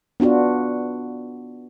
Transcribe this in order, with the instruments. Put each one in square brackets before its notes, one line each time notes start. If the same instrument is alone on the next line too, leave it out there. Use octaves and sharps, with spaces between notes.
[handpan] B3 D4 F4 F#4